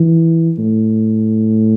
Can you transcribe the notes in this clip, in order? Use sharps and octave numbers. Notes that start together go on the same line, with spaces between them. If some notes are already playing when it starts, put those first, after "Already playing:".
Already playing: E3
A2